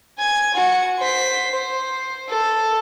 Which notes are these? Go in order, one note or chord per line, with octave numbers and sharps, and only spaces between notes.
G#5 G#6
F#4 C#7
C5 B6
C5
A4